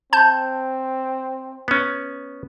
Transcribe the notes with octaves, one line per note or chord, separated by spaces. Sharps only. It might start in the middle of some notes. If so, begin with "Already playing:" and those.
C4 A5 G6
B3 C#4